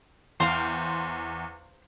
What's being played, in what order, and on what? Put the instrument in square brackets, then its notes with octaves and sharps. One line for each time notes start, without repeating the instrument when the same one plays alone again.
[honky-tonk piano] E2 [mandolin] C5 F5 G5